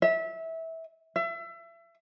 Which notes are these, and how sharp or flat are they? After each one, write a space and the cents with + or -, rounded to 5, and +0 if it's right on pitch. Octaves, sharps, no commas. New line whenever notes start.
E5 -20
E5 +30